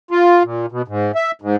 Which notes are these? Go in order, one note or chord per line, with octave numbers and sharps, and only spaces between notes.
F4
A#2
B2
G#2
E5
G#2